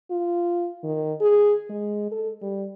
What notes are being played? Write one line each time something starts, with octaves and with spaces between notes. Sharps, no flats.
F4
D#3
G#4
G#3
A4
G3